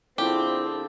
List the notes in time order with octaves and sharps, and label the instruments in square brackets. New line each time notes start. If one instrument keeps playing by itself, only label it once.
[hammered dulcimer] D3 F3 G#4 [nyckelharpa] C4 [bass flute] E4 [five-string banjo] G4